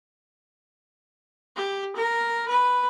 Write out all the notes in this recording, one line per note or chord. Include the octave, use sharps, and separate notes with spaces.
G4
A#4
B4